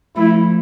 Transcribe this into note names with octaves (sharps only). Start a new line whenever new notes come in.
F3 A3 E4